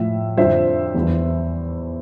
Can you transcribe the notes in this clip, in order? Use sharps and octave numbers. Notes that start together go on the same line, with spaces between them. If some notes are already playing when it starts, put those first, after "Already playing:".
Already playing: A2 F3 E5
F2 D3 F3 C5 E5
E2 E3